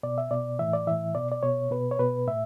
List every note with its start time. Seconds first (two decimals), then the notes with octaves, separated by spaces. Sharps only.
0.03 B2 D5
0.18 E5
0.31 B2 D5
0.59 A2 E3 E5
0.73 D5
0.87 A2 E3 E5
1.15 B2 D5
1.32 D5
1.43 B2 C#5
1.71 B2 B4
1.91 C#5
1.99 B2 B4
2.28 A2 E5